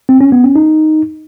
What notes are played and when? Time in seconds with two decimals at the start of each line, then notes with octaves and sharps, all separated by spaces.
0.09 C4
0.21 C#4
0.32 B3
0.44 C#4
0.56 D#4